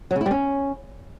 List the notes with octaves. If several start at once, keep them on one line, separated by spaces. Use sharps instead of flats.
F#3
C#3
E4
G3
C#4